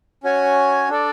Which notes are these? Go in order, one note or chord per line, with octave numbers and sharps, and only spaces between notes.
C#4 F#4 C#5 G#5
D4 A4 D5